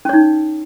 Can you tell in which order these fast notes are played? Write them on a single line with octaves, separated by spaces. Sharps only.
C#4 C#5 D#4